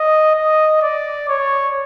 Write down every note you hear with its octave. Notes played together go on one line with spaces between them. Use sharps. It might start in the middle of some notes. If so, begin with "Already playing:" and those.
Already playing: D#5
D#5
D5
C#5